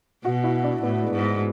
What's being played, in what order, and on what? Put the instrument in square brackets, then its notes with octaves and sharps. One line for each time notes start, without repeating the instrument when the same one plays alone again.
[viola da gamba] B2 [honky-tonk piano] F#4
[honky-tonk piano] E4
D4
[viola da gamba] A2 [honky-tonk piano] B3
[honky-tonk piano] G#3
[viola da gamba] G#2
[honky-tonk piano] B3